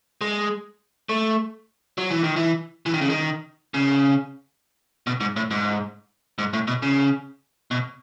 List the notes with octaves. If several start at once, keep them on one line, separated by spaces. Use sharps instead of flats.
G#3
A3
F#3
E3
D#3
E3
E3
D#3
C#3
D#3
C#3
B2
G#2
A2
G#2
G#2
A2
B2
C#3
B2